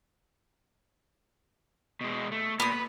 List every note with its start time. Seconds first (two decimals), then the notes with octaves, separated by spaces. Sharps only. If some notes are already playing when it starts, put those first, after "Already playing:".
2.01 B2 G#3
2.32 A3
2.60 A#2 B3 D#6
2.72 B4